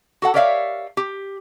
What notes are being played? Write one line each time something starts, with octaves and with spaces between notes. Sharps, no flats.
F#4 A4 F#5
G4 A#4 C#5 D5 E5 F5
G4